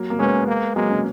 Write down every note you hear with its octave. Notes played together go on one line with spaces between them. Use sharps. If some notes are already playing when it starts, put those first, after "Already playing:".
Already playing: F#3 A#3
A#3
G#3 B3 C#4
A#3
F#3 G#3 A#3
A#3 C#4